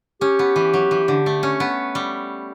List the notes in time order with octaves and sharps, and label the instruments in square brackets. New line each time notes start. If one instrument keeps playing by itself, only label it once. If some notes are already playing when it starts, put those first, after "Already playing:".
[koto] C#4 [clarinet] G4
[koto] B3
E3
F#3
E3
D3
A3
C#4
B3
G3